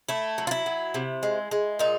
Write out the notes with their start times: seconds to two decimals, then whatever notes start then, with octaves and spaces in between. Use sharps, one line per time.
0.09 A3 E4
0.38 F#3
0.47 F4
0.51 E4
0.66 F#3
0.94 C3
1.23 G#3
1.51 G#3
1.79 A#2 D#4